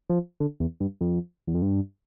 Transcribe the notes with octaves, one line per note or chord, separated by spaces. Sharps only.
F3
D3
E2
G2
F2
E2
F2
G2